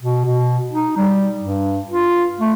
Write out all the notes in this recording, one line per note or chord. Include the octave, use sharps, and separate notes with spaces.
B2
B2
D#4
G3
G2
F4
A3